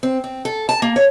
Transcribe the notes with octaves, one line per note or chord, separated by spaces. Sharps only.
C4
C4
A4
A5
A#3
C#5